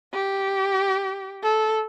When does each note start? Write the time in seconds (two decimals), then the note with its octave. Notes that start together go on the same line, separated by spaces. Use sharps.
0.14 G4
1.43 A4